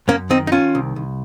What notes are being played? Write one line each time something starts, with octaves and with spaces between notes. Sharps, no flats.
F#2 A#3 C#4
D#3 C4 D#4
D#4
D#3 C#4 F4
C2
C2